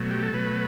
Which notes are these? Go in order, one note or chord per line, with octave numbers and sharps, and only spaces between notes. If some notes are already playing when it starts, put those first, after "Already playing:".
Already playing: B2 F#3 A3
G4
A4
B2 F#3 A3 B4